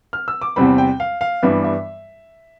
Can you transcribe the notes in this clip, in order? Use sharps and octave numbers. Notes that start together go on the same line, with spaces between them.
F6
E6
D6
E2 C3 G3 C4 B5
G5
F5
F5
G2 E3 G3 B3 D4 E5
E5